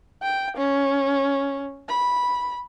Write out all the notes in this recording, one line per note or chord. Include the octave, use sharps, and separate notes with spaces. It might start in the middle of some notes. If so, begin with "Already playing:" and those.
G5
C#4
B5